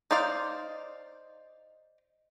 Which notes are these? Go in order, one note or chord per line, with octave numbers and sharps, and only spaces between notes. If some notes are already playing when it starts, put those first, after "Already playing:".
D#4 C5 D5 F5